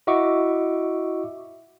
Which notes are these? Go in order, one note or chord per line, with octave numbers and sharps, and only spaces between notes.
E4 F#4 D#5 E5 C#6 D6